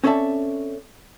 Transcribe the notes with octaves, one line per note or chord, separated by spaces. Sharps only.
C4 C#4 A4 D5 E5 A5